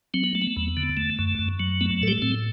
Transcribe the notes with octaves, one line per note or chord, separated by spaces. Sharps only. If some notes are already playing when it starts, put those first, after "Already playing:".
F#3 C4
B3
A3
B3
E2
D3
A3
F#2
F#2
F#3
A3 B3
A2 A4
G3 G4
A2 C4